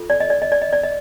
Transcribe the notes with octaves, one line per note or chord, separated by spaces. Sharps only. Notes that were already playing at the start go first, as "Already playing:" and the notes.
Already playing: F4 A4
D5
D#5
D5
D#5
D5
D#5
D5
D#5